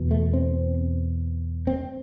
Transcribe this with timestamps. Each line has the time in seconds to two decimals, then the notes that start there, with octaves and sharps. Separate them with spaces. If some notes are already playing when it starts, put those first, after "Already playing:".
Already playing: E2 B2
0.11 A3
0.33 C4
1.67 C4